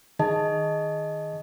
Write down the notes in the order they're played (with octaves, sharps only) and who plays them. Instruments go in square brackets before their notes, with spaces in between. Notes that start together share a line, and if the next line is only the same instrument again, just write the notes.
[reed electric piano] D#3 [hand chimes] G#4 D#5 A5